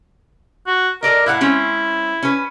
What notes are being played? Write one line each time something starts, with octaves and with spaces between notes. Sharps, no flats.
F#4
A4 A#4 D5 D#5
A2 E4 F5 F#5
G#3 C4 C#4
C#4 B4